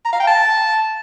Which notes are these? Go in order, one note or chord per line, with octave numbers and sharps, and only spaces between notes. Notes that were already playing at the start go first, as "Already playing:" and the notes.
A#5
F5
G5
A5